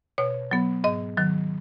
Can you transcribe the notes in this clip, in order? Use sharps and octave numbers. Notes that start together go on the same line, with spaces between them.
B2 C#5
F#3 B3
G#2 D#5
D#3 F#3